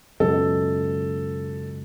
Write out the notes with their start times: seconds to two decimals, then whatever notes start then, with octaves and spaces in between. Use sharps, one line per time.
0.20 C#2 F#2 B2 A4